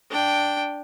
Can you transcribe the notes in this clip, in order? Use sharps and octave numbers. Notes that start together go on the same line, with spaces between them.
D4 G5